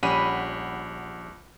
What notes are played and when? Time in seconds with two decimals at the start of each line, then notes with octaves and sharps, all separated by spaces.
0.03 A#1 G3 C#4 F#5 B5 D#7